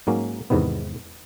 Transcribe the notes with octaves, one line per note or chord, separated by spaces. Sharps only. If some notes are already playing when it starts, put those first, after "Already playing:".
G#2 F#3 A#3 C#4
E2 G#2 C3 D#3 B3